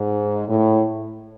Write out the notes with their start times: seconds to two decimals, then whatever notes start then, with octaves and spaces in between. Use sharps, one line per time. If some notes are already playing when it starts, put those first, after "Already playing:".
Already playing: G#2
0.49 A2